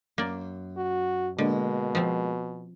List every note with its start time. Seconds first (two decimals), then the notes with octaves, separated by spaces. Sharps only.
0.18 F#2 A#3 D5
0.77 F#4
1.38 B2 D3 G#3 A#3
1.95 F3 C4